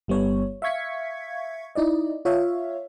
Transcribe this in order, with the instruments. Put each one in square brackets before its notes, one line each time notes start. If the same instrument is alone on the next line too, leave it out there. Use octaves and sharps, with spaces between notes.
[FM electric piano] G1 G3 B3 C#5
E5 F5 C#6 G#6 B6 C#7
D#4 E4 D5 D#5
F4 C#5 E5 F5